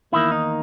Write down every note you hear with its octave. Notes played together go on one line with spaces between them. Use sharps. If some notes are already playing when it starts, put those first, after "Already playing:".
E2 D#3 A#3 E4
D#4